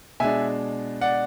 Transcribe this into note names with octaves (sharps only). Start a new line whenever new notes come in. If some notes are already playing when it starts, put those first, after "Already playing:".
B2 G#3 D4 E5 G#5
D5 F#5